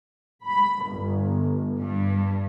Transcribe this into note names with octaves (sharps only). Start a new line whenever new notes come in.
B5
G1
G2